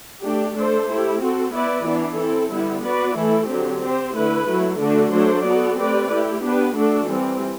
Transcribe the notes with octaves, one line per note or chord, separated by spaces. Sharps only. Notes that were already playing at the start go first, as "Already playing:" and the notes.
A3 D4 G4
A3 D4 A4 C5
A3 E4 G4
C4 F#4 A4
B3 E4 B4 D5
E3 B3 D4
C4 E4 A4
D3 G3 B3 E4
B3 F#4 B4 D5
E3 A3 E4 A4
D3 F#3 C4 G4
C4 G4 C5
D3 A3 E4 B4
F#3 A3 E4
D3 A3 D4 F#4 A4
F#3 A3 D4 A4 C5
B3 F#4 A4 D5
A3 C4 G4 B4 D5
A3 E4 G4
B3 D4 G4 B4
A3 D4 F#4 A4
E3 G3 C4